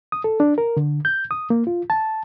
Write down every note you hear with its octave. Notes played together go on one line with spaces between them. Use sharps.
D#6
A4
D4
A#4
D3
G6
D#6
A#3
F4
A5